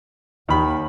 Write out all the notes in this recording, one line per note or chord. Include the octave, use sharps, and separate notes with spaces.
D#2 D#3 B5